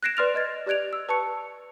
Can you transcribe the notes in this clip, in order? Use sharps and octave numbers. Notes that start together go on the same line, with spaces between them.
F#6 G#6 A#6 C7 D7 E7
B4 D5 C6 F6 A6 F7
B4 D#5 G#6 A6
G4 D5 F#6 G#6 D7 F7
E6
B4 A5 C#6 C#7